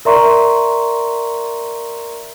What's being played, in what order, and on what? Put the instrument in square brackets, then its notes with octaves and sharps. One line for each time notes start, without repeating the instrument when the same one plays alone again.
[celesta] A#4 D5 E5 A#5 C6 C#6